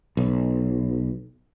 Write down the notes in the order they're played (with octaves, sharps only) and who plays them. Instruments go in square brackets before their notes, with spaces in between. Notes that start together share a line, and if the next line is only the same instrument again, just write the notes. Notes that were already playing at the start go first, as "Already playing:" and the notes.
[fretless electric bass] B1